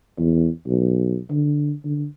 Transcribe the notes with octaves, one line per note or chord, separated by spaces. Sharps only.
E2
B1
D3
D3